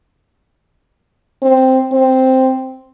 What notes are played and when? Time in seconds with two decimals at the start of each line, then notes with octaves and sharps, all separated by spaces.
1.43 C4
1.92 C4